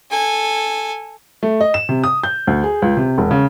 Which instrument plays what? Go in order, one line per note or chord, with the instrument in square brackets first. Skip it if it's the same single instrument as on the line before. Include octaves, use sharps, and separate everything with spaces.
[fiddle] A4 G#5
[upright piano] A3
D#5
E7
C3
D#6
G6
D2
G#4
C#2
C3
E1
C#3